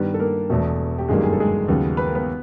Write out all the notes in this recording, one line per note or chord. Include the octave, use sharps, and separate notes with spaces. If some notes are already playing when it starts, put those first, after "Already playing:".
Already playing: G2 D#3 G3 B3 B4
A4
A#3 A#4
E1 E2 B2 A3 A4
G4
G1 F#2 D#3 G3 G#3 A#3 G#4
G#4
A4
G#3 G#4
D#2 C#3 F#3 B3
B4
A#4
B3 B4